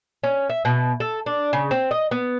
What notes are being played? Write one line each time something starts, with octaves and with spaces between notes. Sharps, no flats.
C#4
E5
B2
A4
D4
C#3
C4
D#5
B3